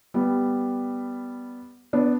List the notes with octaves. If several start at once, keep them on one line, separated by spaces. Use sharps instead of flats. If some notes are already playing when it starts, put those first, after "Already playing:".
G3 B3
B3 D4